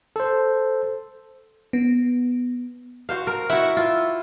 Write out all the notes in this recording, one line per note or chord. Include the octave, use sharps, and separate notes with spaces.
A4 C5
B3
F#4 C5 F5
A#4
E4 F#4 E5 F#5
F4